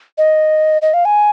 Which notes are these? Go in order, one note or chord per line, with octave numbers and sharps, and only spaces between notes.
D#5
D#5
F5
G#5